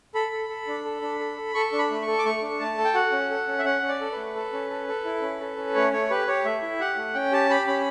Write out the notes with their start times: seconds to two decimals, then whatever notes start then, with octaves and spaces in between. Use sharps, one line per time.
0.15 A4 B5
0.32 A4
0.49 A4
0.67 D4
0.85 A4
1.02 D4
1.19 A4
1.37 A4
1.55 A4 C#6
1.72 D4
1.78 B5
1.90 A3
2.02 C#6
2.07 A4
2.19 D6
2.25 A3 C#6
2.42 D4
2.60 A3 A5
2.78 A4
2.84 G5
2.94 F#4 F#5
3.12 C#4
3.30 A4
3.48 C#4
3.59 E5
3.64 C#4 F#5
3.82 C#4
3.88 D5
4.00 A4
4.12 B4
4.17 A3
4.35 A4
4.53 C#4
4.70 A4
4.88 A4
5.05 E4
5.22 C#4
5.41 A4
5.57 C#4
5.75 A3 C#5
5.92 A3 C#5
6.10 G4 B4
6.27 G4 C#5
6.45 A3 E5
6.62 E4
6.80 G4 F#5
6.97 A3
7.14 C#4 G5
7.32 G4 A5
7.50 G4 B5
7.67 C#4 B5